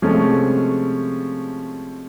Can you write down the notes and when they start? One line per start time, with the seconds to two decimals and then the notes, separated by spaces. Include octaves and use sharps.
0.02 C3 F3 G#3 A3 C#4